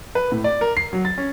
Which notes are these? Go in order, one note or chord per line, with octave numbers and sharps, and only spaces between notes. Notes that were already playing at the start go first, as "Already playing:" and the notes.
B4
A2
D5
A#4
C7
F#3
A6
C#4